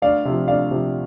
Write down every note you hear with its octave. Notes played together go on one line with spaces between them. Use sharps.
D2 D5 F5
C3 F3
D2 D5 F5
C3 F3